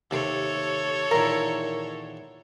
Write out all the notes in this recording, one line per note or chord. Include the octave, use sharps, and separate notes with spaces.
D#2 C3 A4 C#5
E2 A#2 D#3 E4 A#4